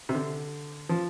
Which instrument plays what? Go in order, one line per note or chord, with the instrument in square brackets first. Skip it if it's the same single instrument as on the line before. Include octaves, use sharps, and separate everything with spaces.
[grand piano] C3
D3
F3